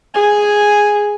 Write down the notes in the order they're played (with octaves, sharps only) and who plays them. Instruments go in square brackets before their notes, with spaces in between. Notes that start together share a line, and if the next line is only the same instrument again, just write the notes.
[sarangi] G#4 [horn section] G#5